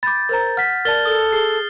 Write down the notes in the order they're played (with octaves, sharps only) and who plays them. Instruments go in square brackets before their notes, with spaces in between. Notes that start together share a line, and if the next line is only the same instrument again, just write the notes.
[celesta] B5 D6 [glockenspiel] G6 A6
[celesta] A#4 C5 A#5 [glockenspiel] A6
[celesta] F#5 B6 [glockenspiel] F6
[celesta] A#4 D5 A5 [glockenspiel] F6 A6 G7
[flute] A4 [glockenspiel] D#6 G7
[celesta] G#4 [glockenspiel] C7 G7